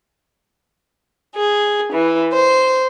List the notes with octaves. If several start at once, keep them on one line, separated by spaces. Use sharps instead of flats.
G#4
E3
C5